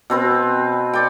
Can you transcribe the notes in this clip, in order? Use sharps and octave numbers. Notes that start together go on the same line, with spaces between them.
B2 C4 B4
C#5 D5 G5